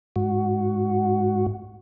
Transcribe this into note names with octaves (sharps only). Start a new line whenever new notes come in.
G#2 F#4